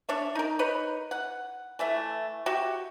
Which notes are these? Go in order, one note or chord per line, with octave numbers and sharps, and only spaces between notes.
D4 C#5 E5
D#4 A#4
D#4 B4 C#5
F#5
E3 A3 E5
F#4 G4 E5